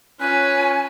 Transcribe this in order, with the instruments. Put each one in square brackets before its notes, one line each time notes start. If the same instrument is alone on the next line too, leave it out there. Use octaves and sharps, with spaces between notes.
[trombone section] C#4 [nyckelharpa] F4 [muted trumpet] B4 [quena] G#5